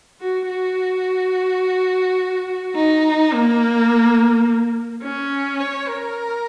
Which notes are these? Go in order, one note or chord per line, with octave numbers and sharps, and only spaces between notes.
F#4
F#4
D#4
A#3
C#4
C#5
A#4